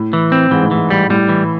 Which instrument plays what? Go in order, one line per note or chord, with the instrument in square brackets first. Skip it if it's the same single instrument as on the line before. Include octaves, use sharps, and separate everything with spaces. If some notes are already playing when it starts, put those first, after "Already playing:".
Already playing: [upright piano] A2
[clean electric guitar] E3
C4
[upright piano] G#2 [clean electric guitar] E3
[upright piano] A2
[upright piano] G#2 [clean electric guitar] E3
[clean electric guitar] G3
[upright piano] A2 [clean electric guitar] G3
[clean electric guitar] E3